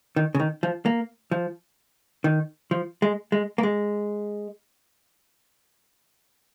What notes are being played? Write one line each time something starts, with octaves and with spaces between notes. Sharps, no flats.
D#3
C#3
D#3
F3
A#3
F3
D#3
F3
G#3
G#3
A#3
G#3